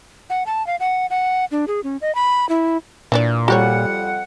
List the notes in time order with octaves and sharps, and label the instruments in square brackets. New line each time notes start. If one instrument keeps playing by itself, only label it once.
[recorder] F#5
A5
F5
F#5
F#5
D4
G#4
C#4
D#5
B5
E4
[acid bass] A#2 [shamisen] E3 D4 D5
[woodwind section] F2 F#5 [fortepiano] G3 [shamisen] F#4 G4 C#5